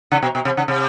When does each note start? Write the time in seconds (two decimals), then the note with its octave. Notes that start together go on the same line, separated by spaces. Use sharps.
0.12 C#3
0.23 B2
0.35 B2
0.45 C3
0.57 C#3
0.68 C3